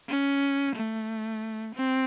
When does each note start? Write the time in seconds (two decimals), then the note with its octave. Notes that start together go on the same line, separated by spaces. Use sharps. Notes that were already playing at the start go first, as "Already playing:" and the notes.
0.09 C#4
0.75 A3
1.75 C4